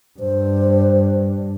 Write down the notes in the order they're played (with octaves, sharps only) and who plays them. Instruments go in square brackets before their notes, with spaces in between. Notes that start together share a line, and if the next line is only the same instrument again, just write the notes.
[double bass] G2 [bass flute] C5